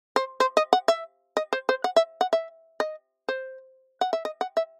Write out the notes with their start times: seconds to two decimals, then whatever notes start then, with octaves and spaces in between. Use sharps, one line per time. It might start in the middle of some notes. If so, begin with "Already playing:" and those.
0.16 C5
0.40 C5
0.57 D#5
0.73 F#5
0.88 E5
1.37 D#5
1.53 C5
1.69 C5
1.84 F#5
1.96 E5
2.21 F#5
2.33 E5
2.80 D#5
3.29 C5
4.01 F#5
4.13 E5
4.25 D#5
4.41 F#5
4.57 E5